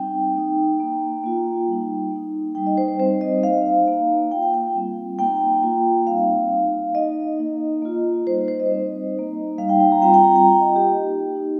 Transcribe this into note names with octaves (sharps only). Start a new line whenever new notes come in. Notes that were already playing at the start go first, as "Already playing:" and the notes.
Already playing: G3 C4 D#4 G5
A#3 D#4
A#3 D#4
A#3 F4
G3 D#4
A#3 D#4
G3 D#4 G5
D#5
C5
C5
G3 C4 D#4 C5
D#5
A#3 D#4 F5
A#3 D#4
A#3 F4 G5
G5
G5
G3 C4 F4
A#3 D#4 G5
A#3 F4
G3 C4 D#4 F5
A#3 D#4
A#3 D#4 D#5
A#3 D#4
A#3 F4
G3 D#4 C5
C5
D#5
G3 C4 D#4
A#3 D#4
G3 D#4 F5
G5
G5
A#5
G3 C4 F4 G5
G5
A#5
G5
A#3 F4 G5
D#5
G4
A#3 D#4
A#3 D#4